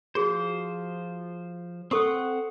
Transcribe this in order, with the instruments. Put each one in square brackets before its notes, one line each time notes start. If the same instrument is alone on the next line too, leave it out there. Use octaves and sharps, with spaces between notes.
[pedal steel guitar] F3 C5 [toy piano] F#4 G#4
[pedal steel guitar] C4 F#5 [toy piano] A4 C#6 D#6